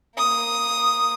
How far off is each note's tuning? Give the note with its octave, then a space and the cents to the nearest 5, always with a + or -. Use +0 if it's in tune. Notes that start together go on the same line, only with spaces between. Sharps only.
A#3 +0 D#6 +0